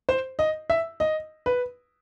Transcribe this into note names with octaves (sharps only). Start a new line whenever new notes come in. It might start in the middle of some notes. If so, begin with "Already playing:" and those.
C5
D#5
E5
D#5
B4